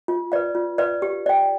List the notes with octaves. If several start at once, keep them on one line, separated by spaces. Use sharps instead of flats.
F4
B4 D5 F5
F4
B4 D5 F5
G4
D5 G5